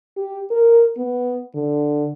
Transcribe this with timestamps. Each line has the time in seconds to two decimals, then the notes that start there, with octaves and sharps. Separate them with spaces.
0.17 G4
0.51 A#4
0.97 B3
1.54 D3